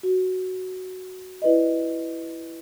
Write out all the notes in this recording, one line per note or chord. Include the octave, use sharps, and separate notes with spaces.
F#4
E4 B4 D5 D#5